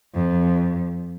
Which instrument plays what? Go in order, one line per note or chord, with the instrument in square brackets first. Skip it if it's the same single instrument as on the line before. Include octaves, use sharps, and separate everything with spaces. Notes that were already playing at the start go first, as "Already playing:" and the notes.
[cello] F2